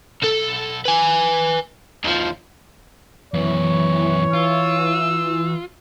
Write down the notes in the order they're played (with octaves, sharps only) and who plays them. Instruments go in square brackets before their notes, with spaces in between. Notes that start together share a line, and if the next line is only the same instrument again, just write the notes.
[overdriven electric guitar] B1 A4
B4 G#5
D#2 F3
[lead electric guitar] F#2 B3 [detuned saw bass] E3 [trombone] C#5
[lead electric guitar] F4 [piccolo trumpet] E6